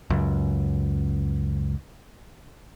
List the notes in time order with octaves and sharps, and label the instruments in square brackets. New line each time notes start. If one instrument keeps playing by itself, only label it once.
[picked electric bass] C#2 F#2